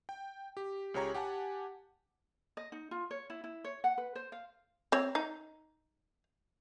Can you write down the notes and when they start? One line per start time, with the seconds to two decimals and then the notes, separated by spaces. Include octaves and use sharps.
0.09 G5
0.57 G4
0.94 C#2 C#3 G4 C#5 A#5 C#6
1.14 G4 F#5 G#5 A5
2.57 D#5
2.72 D#4
2.91 F4
3.11 C#5
3.30 E4
3.44 E4
3.64 C#5
3.84 F#5
3.98 B4
4.15 C5
4.32 F5
4.92 C4 C#5
5.15 D#4